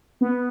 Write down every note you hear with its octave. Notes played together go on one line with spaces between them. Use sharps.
B3